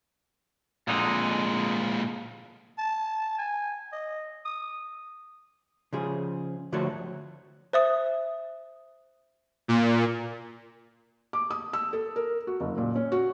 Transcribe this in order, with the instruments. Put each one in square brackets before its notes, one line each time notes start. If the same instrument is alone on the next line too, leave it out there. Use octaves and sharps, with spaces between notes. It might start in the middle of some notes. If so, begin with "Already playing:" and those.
[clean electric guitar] F2 D3 D#4 [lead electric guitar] A#2 G#3
[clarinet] A5
G#5
D#5
D#6
[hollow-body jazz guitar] C#3 F3 G#4
D3 F3 A3 F#4 A4 C#5
[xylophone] C5 E5 D#6
[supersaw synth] A#2
[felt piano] D6
D#6
E6
A4
A#4
F#4
F#1
A#2
C#4
F#4